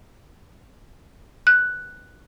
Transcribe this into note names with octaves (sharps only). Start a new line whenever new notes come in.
F#6